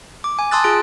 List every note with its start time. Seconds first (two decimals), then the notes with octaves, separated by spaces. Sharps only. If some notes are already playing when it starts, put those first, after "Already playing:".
0.24 D6
0.39 G#5
0.51 A5 C6 D#6 E6 F#6 A6
0.64 F4 G#4 F#6 D7